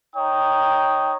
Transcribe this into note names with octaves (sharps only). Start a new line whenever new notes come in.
D#4 C#5 G5 A#5 D#6